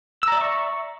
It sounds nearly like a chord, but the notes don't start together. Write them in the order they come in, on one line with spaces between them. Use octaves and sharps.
E6 A#5 D5 E5 C#6